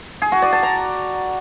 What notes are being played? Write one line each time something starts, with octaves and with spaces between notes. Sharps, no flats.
G#4
F#4
D5
A5
A#5